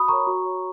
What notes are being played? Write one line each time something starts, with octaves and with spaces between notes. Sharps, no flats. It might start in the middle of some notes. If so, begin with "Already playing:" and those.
Already playing: F#4 B5 D#6
A#4 C#5 A#5 C#6
F#4
C#5